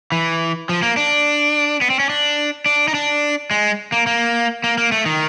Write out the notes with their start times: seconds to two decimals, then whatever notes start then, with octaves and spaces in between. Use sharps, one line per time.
0.12 E3
0.69 F3
0.82 A#3
0.97 D4
1.81 B3
1.90 C4
1.99 C#4
2.09 D4
2.66 D4
2.88 D#4
2.94 D4
3.51 G#3
3.92 A#3
4.07 A#3
4.64 A#3
4.78 A#3
4.92 A3
5.06 D#3